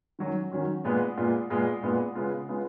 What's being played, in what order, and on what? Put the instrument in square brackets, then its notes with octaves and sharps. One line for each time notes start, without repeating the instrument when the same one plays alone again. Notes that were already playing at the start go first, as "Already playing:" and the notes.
[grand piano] D#3 F#3 C#4 F#4
D#3 F#3 C#4 F#4
A#2 G#3 B3 F4
A#2 G#3 B3 F4
A#2 G#3 B3 F4
A#2 G#3 B3 F4
C#3 G#3 B3 F4
C#3 G#3 B3 F4